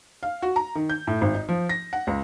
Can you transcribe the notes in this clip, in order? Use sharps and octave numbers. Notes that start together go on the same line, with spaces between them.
F5
F#4
A#5
D#3
G6
A2
G#1
D#4
F3
A#6
F#5
C#2